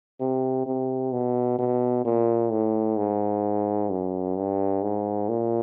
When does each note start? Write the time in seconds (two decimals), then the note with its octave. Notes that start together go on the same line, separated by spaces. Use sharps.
0.20 C3
0.66 C3
1.12 B2
1.59 B2
2.05 A#2
2.51 A2
2.97 G#2
3.90 F#2
4.37 G2
4.83 G#2
5.29 A#2